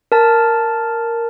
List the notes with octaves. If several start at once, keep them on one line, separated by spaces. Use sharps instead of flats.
A#4 A5